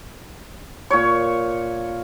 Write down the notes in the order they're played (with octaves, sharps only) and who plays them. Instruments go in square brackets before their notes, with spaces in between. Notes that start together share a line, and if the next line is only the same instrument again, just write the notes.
[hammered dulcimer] A#2 C#5